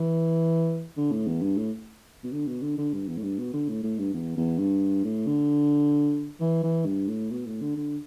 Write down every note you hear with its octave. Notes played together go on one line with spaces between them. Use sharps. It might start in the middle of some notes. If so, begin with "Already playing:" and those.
Already playing: E3
D3
A2
E2
G2
A2
B2
D3
B2
D3
D3
G2
E2
A2
G2
B2
D3
A2
A2
G2
E2
E2
G2
A2
D3
E3
E3
G2
A2
B2
A2
D3
D3